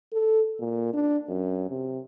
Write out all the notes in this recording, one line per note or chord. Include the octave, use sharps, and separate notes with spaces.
A4
A#2
D4
F#2
C3